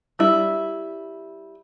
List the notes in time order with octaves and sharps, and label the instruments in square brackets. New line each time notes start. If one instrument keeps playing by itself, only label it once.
[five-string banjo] G3 E4